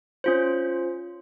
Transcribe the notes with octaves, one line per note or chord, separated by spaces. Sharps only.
C#4 F4 C5